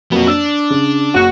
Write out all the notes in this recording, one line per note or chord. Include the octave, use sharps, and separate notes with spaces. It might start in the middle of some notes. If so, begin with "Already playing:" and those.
F2 F#3 A#3 B3 F#4
D4 E6
C#3
F#1 F#4